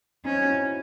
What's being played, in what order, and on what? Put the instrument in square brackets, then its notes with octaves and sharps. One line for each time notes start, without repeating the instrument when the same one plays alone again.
[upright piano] C4 D#4 [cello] C#4
[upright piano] F#4
C#4 E4